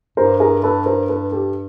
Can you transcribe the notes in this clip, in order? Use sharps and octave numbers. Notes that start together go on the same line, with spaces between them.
G2 A#4 C5
G#4 A#4
A4 B4
A#4 C5
A4 B4
G4 A4